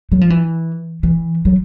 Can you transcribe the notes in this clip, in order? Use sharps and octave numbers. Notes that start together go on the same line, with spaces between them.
F#3
F3
E3
E3
F#3